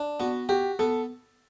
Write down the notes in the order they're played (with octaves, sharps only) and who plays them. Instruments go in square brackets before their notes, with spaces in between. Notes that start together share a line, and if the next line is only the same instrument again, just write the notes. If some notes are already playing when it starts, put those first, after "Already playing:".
Already playing: [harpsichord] D4
[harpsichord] B3 [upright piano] F#4
[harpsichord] F#4 [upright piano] G4
[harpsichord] B3 [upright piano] A4